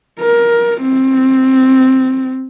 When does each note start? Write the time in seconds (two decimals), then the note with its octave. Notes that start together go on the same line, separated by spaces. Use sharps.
0.20 A#4
0.82 C4